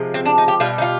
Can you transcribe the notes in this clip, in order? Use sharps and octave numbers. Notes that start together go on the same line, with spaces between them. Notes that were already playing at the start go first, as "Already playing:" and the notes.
Already playing: C3 F3 G#3
C4
D4
D#4
G4
B2 G3 F4
D#4
F4